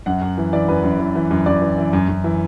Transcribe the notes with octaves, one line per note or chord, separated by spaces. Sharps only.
F#2 F#5
F#2
E3
E3 D5
F#2 B4
F#2
E3
E3
F#2
F#2 D5
E3
E3
F#2
F#2
E3